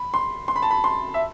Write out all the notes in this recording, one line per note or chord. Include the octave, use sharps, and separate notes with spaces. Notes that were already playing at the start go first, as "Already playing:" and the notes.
Already playing: B5
C6
C6
B5
A5
B5
C6
E5